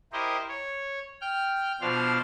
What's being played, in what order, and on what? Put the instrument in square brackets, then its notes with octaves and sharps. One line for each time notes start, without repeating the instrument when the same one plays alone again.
[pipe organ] E4 G4 A#4 C5 D#5
C#5
G5 F6
B2 F3 D4 C5 F5 F6